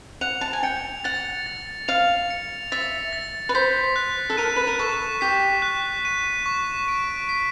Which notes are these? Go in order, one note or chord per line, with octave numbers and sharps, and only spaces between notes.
F#5 F7
A5
G#5
G5 C#7
F#5 A6
A6
F5 F7
C#7
E5 A6
A6
B4
C5 B6
F#6
A4
A#4 D#7
B4
A#4
A4 C#6
G4 B6
F#6
D#7
C#6
D7
B6